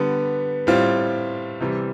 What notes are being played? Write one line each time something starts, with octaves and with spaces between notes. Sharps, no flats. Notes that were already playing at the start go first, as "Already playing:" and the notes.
Already playing: D3 G3 B3
A2 G3 C4 F4
C3 E3 G3